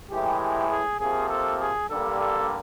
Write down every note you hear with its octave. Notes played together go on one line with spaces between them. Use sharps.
A2 E3 G#3 G4
G4
G#4
C3 F3 A#3 G#4
A4
G#4
G2 D3 G3 A#3 A4
A4